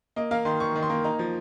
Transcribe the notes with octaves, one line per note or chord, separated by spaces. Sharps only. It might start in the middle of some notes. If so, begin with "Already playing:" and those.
A#3 D#5
A#3 F5
D#3 C6
D#3 C#6
D#3
C6
A#3
D#4 A#5
F3